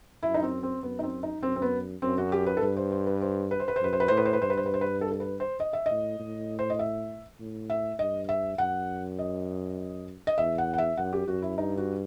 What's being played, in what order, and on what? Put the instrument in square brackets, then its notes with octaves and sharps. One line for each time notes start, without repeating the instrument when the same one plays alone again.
[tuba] F#2 [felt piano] E4
[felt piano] D#4
C4
C4
[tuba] F#2 [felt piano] B3
[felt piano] D#4
C4
D#4
[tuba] F#2 [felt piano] C4
[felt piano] C4
B3
[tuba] F#2 [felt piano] C4
[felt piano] F#4
G4
B4
A4
[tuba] G2 [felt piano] B4
[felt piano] C5
C5
B4
C5
B4
C5
B4
C5
[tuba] F#2 [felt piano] B4
[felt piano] C5
B4
[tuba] A2 [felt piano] C5
[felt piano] B4
C5
B4
[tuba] G2 [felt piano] C5
[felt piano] B4
C5
B4
C5
B4
A4
A4
B4
C5
D#5
E5
[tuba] A2 [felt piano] D#5
[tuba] A2
[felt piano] C5
D#5
E5
[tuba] A2
[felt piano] E5
[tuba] G2 [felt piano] D#5
[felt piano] E5
[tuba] F#2 [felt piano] F#5
[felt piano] D#5
D#5
[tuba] E2 [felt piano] E5
[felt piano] F#5
F#5
E5
[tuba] F#2 [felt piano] F#5
[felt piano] G4
[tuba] F#2 [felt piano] F#4
[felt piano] E4
[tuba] G2 [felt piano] D#4
[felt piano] F#4